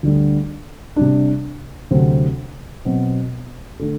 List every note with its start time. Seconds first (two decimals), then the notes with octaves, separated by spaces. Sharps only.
0.03 D2 D3 G3
0.96 C3 G3 D4
1.91 D2 C3 F#3 C4
2.85 B2 F#3 C4
3.79 D3 A3